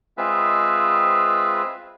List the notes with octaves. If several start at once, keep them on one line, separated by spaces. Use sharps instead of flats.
G#3 C4 F4 G#4 B4 E5